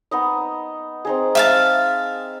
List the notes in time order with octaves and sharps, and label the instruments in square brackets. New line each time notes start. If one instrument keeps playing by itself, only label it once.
[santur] B3 D#4 D#5
C4 D#4 G#4
[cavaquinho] E5 F5 A5